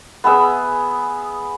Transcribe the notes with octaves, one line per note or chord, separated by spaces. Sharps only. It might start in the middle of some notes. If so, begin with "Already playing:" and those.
B3 G#4 E5 E6